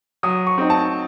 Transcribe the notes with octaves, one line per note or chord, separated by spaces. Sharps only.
F#3 D#6
C#6
C4 D#4
A5